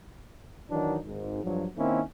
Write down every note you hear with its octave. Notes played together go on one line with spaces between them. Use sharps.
D#3 E3 F#3 D4 D#4
G#1 G#2
G2 F3 F#3
D#3 A#3 C4 C#4 E4